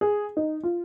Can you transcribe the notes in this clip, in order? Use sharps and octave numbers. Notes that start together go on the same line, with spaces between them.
G#4
D#4
F4